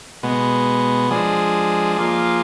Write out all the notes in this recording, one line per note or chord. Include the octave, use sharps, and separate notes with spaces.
B2 G#3 B3
F3 G#3 D4 G#4
F3 A#3 F4 G#4